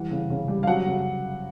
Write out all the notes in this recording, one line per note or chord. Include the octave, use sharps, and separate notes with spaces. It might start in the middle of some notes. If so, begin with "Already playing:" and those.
Already playing: E3 G3 F#5
C#3
C#3
G3
F5
F#3 F#5
C#3